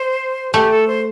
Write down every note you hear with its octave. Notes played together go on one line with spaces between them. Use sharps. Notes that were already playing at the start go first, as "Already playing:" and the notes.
Already playing: C5
A3 G4
A4
C5